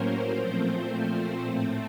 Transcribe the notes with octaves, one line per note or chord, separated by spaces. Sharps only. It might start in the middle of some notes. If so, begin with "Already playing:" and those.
Already playing: A2 F#3 A#3 C#4 A#4 C5
A#2 F3 A3 C4 C5
A2 A3 C4